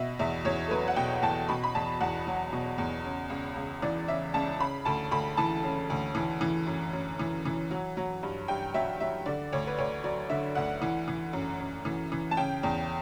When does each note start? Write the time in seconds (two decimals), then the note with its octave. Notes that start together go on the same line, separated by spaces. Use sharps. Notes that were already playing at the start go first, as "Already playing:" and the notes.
Already playing: B2 E5
0.19 E2 E5
0.45 E2 C#5
0.68 A4
0.71 F#3 B4
0.88 F#5
0.96 B2 G5
1.23 E2 A5
1.49 B2 B5
1.64 B5
1.75 E2 A5
2.00 E2 F#5
2.27 F#3
2.53 B2
2.78 E2
3.04 C#3
3.30 C#2
3.56 C#2
3.82 E3 D5
4.08 C#3 E5
4.34 C#2 A5
4.60 C#3 B5
4.85 D2 A5
5.11 D2 B5
5.37 E3 A5
5.63 C#3
5.90 D2
6.15 E3
6.41 E3
6.67 F#2
6.93 F#2
7.19 E3
7.45 E3
7.71 F#3
7.97 F#3
8.23 G2
8.48 G2 G5
8.74 F#3 E5
9.00 F#3 E5
9.26 D3 D5
9.53 D2 C#5
9.67 B4
9.78 D2 C#5
10.04 F#3 D5
10.30 D3 E5
10.55 D2 F#5
10.82 E3
11.08 E3
11.33 F#2
11.60 F#2
11.85 E3
12.12 E3
12.31 A5
12.37 C#3 G5
12.63 E2